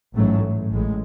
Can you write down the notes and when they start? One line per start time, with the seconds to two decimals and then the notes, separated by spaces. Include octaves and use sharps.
0.15 A1 G#2 F#3 A3
0.72 A1 A2 G#3